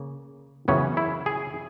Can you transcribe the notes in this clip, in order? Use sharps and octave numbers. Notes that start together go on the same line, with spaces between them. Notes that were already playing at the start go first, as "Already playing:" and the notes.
Already playing: C#3 A#3
F#2 C#3 E3 B3 C#4
E4
G#4